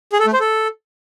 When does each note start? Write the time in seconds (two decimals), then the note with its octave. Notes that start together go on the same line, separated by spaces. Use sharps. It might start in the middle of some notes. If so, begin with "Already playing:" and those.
0.13 G#4
0.19 A4
0.26 A3
0.33 C5
0.40 A4